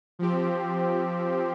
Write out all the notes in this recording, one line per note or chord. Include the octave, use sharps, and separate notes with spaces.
F3 C4 G4